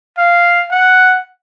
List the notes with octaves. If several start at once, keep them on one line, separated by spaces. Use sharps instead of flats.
F5
F#5